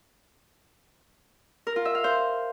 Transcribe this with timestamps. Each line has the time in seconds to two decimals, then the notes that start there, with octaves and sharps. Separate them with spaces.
1.67 A#4
1.76 F4
1.85 E5
1.95 F5
2.04 C5